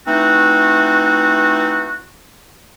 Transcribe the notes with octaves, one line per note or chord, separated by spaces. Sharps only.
E3 A3 C4 D#4 F#4